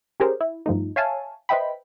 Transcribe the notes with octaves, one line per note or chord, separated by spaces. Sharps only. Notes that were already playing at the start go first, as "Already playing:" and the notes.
C#4 G4 G#4 A#4 C5
E4
G2 F3 A3 D#4
C#5 E5 F5 G#5 A5
B4 C5 D#5 E5 G5 B5